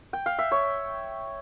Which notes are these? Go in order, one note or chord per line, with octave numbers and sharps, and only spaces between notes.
G5
F5
E5
C#5